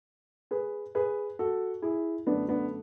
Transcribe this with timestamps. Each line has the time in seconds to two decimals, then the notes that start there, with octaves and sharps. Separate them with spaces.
0.51 G#4 B4
0.95 G#4 B4
1.39 F#4 A4
1.82 E4 G#4
2.27 F#2 D3 A3 B3 D4
2.48 B3 D4